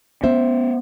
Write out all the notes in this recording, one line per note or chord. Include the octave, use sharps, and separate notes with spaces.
B3 C#4 C5 E5